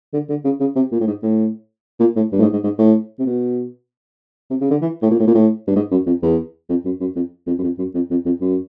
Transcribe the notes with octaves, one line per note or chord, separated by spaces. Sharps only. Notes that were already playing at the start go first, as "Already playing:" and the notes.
D3
D3
C#3
C#3
C3
A#2
A2
G#2
A2
A#2
A2
G2
A2
G#2
G#2
G#2
A2
C3
B2
C3
C#3
D3
E3
A2
A#2
A2
A#2
A2
G2
G#2
F#2
F2
E2
F2
F#2
F#2
F2
F2
F#2
F2
F#2
F2
F2
F2
F#2